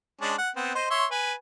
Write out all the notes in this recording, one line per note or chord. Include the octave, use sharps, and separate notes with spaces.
G#3 C#4 D4
F#5
B3 C4
C5 D#5
C#5 E5 C6
B4 G#5